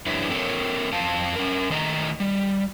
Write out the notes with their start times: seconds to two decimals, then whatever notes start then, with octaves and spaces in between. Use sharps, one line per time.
0.06 F#2 D4 E4 B4 C#5 E5
0.29 C4 A4 A#4 C#5
0.92 F2 C4 F5 A5
1.36 C#4 A#4
1.70 D#3 A3 A4 D#5 G#5 A#5
2.20 G3